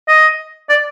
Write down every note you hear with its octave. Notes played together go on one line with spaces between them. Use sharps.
D#5
D5